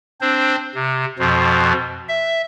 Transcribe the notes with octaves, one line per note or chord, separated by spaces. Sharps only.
C4 D4 C5
C3
F2 B2 F3
E5